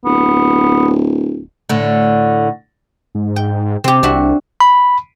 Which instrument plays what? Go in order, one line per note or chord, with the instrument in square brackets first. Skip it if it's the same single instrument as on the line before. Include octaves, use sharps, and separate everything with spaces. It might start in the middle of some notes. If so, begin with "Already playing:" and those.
[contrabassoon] D1 [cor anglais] B3
[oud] A2 D3
[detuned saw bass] G#2
[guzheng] G5
[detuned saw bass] C3 [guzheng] C4 G4
[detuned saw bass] C2 [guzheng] D4 F#4 E5
[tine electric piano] B5